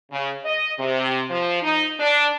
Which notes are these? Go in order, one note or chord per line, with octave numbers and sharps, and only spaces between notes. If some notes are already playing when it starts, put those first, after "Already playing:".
C#3
D#5
C3
F3
D#4
D4